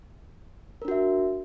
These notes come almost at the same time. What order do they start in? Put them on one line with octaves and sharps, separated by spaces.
A#4 D4 F#4 E5